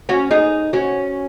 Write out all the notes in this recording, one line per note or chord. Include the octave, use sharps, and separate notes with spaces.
C#4 F#4
D#4 G#4
C#4 F#4